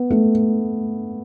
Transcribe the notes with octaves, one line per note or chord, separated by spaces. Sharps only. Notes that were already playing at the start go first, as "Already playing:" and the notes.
Already playing: B3
A3